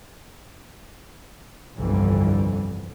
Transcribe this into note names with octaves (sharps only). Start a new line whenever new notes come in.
G1 C2 F2 D3 E3 G3